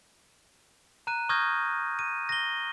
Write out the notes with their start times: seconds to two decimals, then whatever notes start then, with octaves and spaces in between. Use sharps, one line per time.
1.07 A#5 F#6 D#7
1.29 C#6 D#6 F6 G6 G#6 A#6
1.99 D#7
2.29 A#6 G7